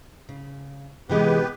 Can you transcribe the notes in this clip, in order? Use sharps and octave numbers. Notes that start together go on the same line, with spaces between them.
C#3
C3 E3 G#3 B3 G4 B4